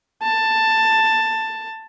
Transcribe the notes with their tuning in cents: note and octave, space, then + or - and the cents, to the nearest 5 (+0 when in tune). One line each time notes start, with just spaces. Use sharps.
A5 +10